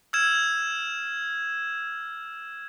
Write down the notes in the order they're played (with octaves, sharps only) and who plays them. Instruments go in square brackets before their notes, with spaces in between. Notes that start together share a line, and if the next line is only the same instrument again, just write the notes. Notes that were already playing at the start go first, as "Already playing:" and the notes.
[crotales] E6 F6 G#6 E7